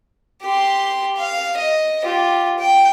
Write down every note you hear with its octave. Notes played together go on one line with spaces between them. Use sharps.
G4 C6
F5
D#5
F4 G4
G5